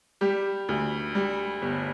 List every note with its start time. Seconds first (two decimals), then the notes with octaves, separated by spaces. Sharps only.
0.21 G3 G4
0.69 D2
1.15 G3
1.62 G1